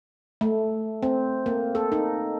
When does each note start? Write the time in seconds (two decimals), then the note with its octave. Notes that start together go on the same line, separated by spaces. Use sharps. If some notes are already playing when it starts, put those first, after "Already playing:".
0.41 A3
1.03 C4
1.46 A#3
1.75 A4
1.92 D#4